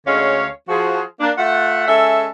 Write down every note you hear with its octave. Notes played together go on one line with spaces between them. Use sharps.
D2 D3 G#3 C#4 C#5 F5
F3 F#4 G#4
A#3 D4
A3 F4 E5 F#5
G#3 C#4 A4 E5